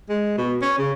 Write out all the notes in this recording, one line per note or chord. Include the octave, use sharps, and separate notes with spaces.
G#3
B2
C#4
C#3